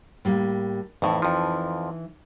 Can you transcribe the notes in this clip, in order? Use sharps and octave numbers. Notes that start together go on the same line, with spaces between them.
A2 G3 A#3
F2 A2 E3 D#4 E4
F2 F3